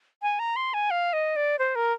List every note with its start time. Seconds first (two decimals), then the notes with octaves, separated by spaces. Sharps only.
0.22 G#5
0.39 A#5
0.56 C6
0.74 G#5
0.90 F5
1.13 D#5
1.36 D5
1.59 C5
1.75 A#4